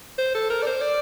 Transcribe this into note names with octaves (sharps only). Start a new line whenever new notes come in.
C5
A4
A#4
D5
C5
D5